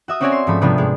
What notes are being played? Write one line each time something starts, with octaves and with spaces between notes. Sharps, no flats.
F#4 E5 D#6
C4 C#4 F#4 C#5 D5 G#5
C6
G#2 F3 A3 B5
C3 F3 G3 B3 D4
G#2 G#3